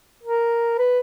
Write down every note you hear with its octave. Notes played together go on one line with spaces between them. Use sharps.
A#4
B4